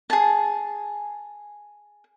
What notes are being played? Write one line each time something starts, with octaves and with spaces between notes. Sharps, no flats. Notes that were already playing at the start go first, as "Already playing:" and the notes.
G#4 A5